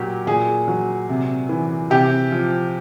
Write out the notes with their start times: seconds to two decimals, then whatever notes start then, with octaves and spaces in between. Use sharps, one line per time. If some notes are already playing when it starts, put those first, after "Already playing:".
Already playing: A#2 F#3 G4
0.27 A#2 G#4
0.68 F#3
1.09 C3
1.49 E3
1.90 C3 G4
2.31 F3